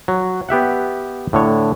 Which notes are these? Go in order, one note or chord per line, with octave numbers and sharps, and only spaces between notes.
F#3
B3 G4 E5 F#5
A2 D3 C#5